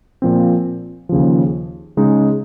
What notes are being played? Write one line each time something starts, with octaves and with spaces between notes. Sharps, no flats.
A#2 F3 C4
D#2 C#3 F3
C#3 G#3 D#4